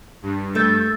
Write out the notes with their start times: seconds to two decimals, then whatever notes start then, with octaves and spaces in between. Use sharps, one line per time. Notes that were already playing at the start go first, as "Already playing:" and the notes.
0.23 G2
0.55 A3 E6 G6 A6